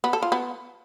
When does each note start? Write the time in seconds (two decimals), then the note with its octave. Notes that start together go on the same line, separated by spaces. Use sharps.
0.04 B3
0.13 A4
0.23 F4
0.32 B3